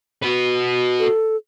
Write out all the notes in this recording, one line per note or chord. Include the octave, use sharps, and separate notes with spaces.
F#4 B4
A4